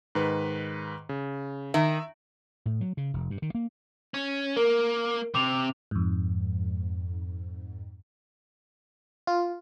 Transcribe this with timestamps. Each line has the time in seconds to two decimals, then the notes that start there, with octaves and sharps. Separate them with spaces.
0.15 G#2 D#3 B4
1.09 C#3
1.74 D#3 E5
2.66 A2
2.81 F#3
2.97 C#3
3.14 F1
3.30 G2
3.42 D#3
3.55 A#3
4.14 C#4
4.57 A#3 A#4
5.35 C3 D6 F7
5.91 F2 G#2
9.27 F4